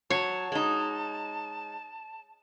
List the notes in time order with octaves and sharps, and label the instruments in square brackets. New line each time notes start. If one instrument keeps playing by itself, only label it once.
[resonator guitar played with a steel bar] F#3 [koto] C#5 [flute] A5
[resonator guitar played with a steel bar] G#3 D#4